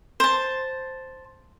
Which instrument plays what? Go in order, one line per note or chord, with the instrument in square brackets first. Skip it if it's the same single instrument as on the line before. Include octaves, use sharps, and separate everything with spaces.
[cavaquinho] C5 A5